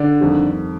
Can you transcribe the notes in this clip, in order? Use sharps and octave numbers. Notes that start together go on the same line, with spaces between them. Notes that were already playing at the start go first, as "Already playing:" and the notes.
Already playing: D3 D4
F2 D#3 G3